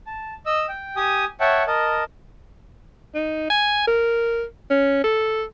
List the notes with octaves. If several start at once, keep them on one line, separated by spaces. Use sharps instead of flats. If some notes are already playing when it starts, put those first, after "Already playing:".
A5
D#5 E6
G5
G4 G#5 D#6
C#5 E5 F#5 G5 A5
A#4 D#5 A5
D#4
G#5
A#4
C#4
A4